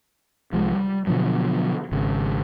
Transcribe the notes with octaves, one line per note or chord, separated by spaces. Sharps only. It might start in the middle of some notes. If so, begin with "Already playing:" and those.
C2 F3 G#3
G3
B2 D3 F3 F#3
G#1 C#3